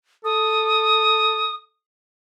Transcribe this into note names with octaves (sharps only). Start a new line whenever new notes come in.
A4 D#6